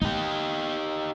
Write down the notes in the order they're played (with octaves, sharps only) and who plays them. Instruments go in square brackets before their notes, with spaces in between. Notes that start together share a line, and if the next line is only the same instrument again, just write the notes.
[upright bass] B3 [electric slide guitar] D#4 G4